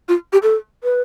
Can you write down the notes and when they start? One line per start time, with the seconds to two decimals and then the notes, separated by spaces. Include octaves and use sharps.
0.08 F4
0.33 G4
0.43 A4
0.84 B4